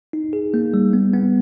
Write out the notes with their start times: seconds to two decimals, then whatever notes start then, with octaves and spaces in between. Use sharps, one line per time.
0.13 D#4
0.33 G#4
0.54 A#3
0.74 G3
0.93 B3
1.14 B3